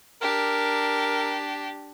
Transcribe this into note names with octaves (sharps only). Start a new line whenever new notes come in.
D4 G4 A#4